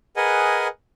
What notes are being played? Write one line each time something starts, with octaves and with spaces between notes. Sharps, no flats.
G#4 A#4 B4 D#5 F#5 G#5